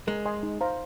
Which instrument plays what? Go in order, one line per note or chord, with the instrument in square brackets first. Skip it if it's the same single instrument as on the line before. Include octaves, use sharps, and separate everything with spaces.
[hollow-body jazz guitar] G#3 [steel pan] A#4
[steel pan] D#5 G#5 C6
D#4
C5 F5 A#5